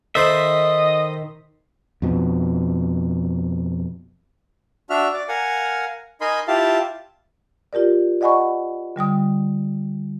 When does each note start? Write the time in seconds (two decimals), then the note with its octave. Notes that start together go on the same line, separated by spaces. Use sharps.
0.15 D#3 A4 C5 D#5 E5 B5
2.02 F2 B2
4.90 D4 F#4 E5 F6
5.14 D5
5.29 A#4 F5 F#5 G#5
6.21 D#4 A#4 D#5 G#5 B5 C6
6.48 E4 F4 G4 F5 A5
7.73 F4 G4 A#4 D5
8.21 D5 D#5 F#5 G#5 B5 C#6
8.96 D3 G3 G5 D#6